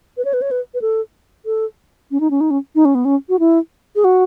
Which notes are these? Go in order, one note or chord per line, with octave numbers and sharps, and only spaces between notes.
B4
C#5
B4
C#5
B4
B4
A4
A4
C#4
D#4
C#4
D#4
C#4
D#4
C#4
B3
C#4
F#4
E4
G#4
F#4